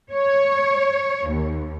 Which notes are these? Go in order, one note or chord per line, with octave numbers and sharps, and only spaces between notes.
C#5
D#2